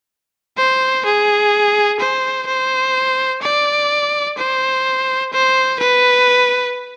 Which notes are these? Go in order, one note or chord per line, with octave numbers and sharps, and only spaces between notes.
C5
G#4
C5
C5
D5
C5
C5
B4